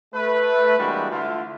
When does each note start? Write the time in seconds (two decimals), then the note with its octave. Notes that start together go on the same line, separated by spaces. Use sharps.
0.13 A3 B4
0.78 E3 G3 G#3 A#3 D4 F#4
1.11 D3 A3 E4 F4